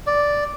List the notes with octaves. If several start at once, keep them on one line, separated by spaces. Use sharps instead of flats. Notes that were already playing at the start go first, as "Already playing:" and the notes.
D5